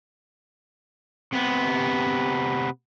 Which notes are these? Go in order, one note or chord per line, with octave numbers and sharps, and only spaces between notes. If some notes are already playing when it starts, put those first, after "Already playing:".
C3 B3